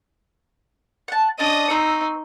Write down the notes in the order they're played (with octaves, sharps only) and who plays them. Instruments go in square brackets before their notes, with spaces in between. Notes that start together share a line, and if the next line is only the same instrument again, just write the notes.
[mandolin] F#5 A5
[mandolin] C#4 D4 D5 [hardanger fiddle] D#5 D#6
[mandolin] C4 C#6 E6 [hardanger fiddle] D#4